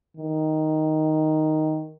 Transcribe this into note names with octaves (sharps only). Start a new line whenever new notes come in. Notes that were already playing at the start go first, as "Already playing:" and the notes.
D#3